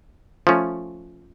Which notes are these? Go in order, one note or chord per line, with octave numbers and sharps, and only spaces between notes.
F3 A3 C#4